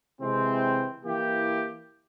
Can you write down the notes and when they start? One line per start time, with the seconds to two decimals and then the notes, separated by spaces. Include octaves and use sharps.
0.20 C3 E3 G#3 C4
1.04 E3 A#3 E4 G4